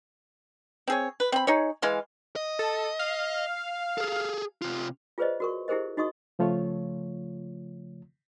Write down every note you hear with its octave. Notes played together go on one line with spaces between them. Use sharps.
C4 G#4 C#5
B4
C4 B5
D#4 G#4 C#5
E3 G#3 F5 C6
D#5
A4
F5
G#4 A4
C3 F4
F4 G#4 B4 C5 D5 D#5
F#4 A#4 C#6
E4 G4 G#4 A#4 C5 D#5
D#4 F#4 D#5 C#6 D#6
C#3 F3 A3 F4 C#5